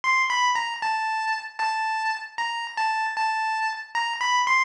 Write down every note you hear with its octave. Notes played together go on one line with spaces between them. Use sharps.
C6
B5
A#5
A5
A5
A#5
A5
A5
A#5
B5
C6